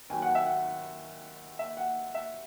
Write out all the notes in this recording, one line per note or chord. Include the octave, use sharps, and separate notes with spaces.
D#2 D#3 F#3 G#5
F#5
E5
F#5
E5
F#5
E5